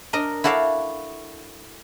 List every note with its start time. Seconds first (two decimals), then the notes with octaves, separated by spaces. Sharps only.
0.13 D4 A#4 D#5
0.44 E4 F#4 A4 D5 F5